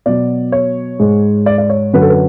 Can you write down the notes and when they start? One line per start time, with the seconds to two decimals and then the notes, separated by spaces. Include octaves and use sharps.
0.06 B2 F#3 D5
0.52 C#5
0.99 G#2 G#3
1.46 D5
1.58 D5
1.70 C#5
1.93 F#2 D3 F#3 B4
2.02 A4
2.09 B4